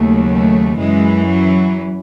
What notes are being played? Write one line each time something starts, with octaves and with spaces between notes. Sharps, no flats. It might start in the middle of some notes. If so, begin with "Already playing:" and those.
Already playing: D#2 C#3 F#3 A3
A3
F#2 E3 G#3
F#3